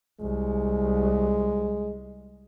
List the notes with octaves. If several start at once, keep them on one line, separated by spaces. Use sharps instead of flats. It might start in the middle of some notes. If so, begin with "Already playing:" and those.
C2 G#3